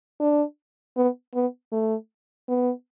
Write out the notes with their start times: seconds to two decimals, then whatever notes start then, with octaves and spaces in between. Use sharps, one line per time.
0.20 D4
0.97 B3
1.34 B3
1.72 A3
2.48 B3